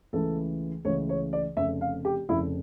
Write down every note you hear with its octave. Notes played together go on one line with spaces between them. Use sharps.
C#2 C#3 E3 A3 A4
C#2 C#3 E3 A3 C#5
C#5
D5
F1 F2 C#3 E5
F5
G4
F1 F2 C#3 E4